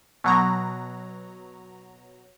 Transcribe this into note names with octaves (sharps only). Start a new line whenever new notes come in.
B2 F#3 A#5